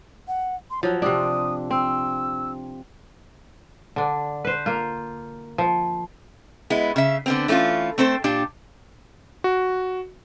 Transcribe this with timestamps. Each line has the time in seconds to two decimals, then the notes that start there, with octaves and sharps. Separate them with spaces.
0.28 F#5
0.70 C6
0.83 F3 F#3 C#5
1.02 C3 C4 D4 D#6
1.71 C4 E6
3.96 D3 D4
4.45 B4 C5
4.66 A#3 F4
5.58 F3
6.70 G#3 B3 E4
6.96 C#3 E5
7.26 D3 B3 C4
7.48 E3 A3 C#4 E4 F4
7.98 A3 C4 A4 C5
8.24 A#2 D4 G4
9.44 F#4